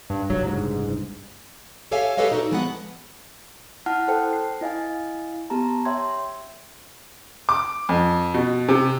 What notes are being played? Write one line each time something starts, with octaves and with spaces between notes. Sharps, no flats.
G2
F#1 C2 G2 F#3
G#2
G4 A4 C#5 E5 F5 G#5
G4 A4 B4 C#5 D#5 F5
D#4 E4 F#4 A4 C#5 D5
F3 G#3 B3 G4 B4 F#5
E4 F#5 A5 F6
A4 C5 G5 A5
C7
E4 D#5 F5 G#5
B3 G4 A5 A#5
C#5 E5 G5 C6 G#6
D6
F2
B2
C3